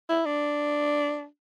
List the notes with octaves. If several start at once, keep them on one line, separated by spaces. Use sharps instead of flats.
E4
D4